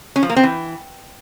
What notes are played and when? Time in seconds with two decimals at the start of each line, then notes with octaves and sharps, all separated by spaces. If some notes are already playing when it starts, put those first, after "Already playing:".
0.16 C#4
0.23 F3
0.30 A#3
0.36 C4
0.43 E3